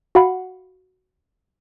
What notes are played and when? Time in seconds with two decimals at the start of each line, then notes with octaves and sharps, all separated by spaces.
0.15 F#4 F5 F#5 B5